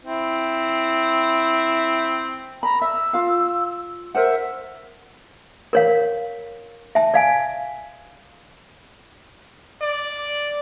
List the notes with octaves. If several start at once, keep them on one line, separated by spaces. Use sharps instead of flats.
C4 E4
A#5 B5
E5 E6
F4 F5
A#4 C5 E5 F#5
A#4 C#5 F5
E5 A5
D5 F5 G#5
D5